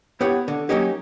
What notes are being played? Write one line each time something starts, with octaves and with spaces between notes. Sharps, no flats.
B3 E4 G4 B4 C#5 F#5
D3
F#3 A3 A#3 C#4 D#4 G4